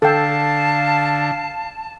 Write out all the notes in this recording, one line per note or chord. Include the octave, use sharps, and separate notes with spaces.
D3 A4 F5 G5 A5